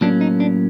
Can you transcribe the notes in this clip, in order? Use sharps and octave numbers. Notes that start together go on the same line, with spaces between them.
A2 F#3 A#3 C#4 D4
D#4
D4